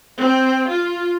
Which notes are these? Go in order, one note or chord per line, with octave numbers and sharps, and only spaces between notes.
C4
F4